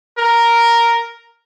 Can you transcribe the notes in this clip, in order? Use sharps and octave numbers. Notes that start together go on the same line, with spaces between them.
A#4